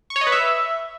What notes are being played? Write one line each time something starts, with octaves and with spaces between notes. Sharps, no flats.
C#6
C#5
D#5
B4
E5